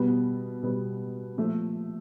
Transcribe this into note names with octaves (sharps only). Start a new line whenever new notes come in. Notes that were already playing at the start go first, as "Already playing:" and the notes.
Already playing: B2 G3 B3
B2 G3 B3
A#2 F3 A3